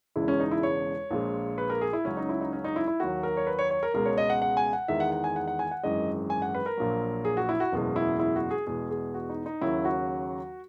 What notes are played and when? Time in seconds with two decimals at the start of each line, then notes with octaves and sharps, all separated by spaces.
0.16 E1 E2 C#3 G#3 E4
0.28 C#4
0.40 D#4
0.51 E4
0.63 C#5
1.11 A#1 A#2 G#3
1.58 B4
1.70 A#4
1.81 G#4
1.93 E4
2.05 C#2 C#3 F#3 C#4
2.17 D#4
2.29 E4
2.41 D#4
2.53 C#4
2.64 D#4
2.76 E4
2.87 E4
3.00 D#2 D#3 F#3 F#4
3.23 A#4
3.37 C#5
3.47 B4
3.59 C#5
3.70 C#5
3.83 A#4
3.94 C#2 B2 G#3 A#4
4.06 C#5
4.18 D#5
4.30 F#5
4.42 F#5
4.57 G#5
4.73 F#5
4.88 E2 D#3 G#3 E5
5.00 F#5
5.12 F#5
5.24 G#5
5.36 F#5
5.48 F#5
5.59 G#5
5.71 F#5
5.83 G#1 F#2 E3 G#3 D#5
6.30 G#5
6.42 F#5
6.55 B4
6.66 A#4
6.77 A#1 A#2 F#3
7.25 G#4
7.37 F#4
7.49 E4
7.60 F#4
7.72 F#1 E2 B2 G#3
7.96 E4
8.20 E4
8.36 F#4
8.51 G#4
8.67 E2 B2 G#3 G#4
8.91 G#4
9.14 F#4
9.29 D#4
9.46 D#4
9.61 D#2 C#3 F#3 E4
9.85 F#4